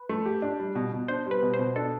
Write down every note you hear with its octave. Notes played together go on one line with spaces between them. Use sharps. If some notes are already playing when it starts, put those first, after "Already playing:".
Already playing: B4
A3
G4
D4
G3
B2
B2
D4 C5
G3 B4
B2
C5
B2
D4 A4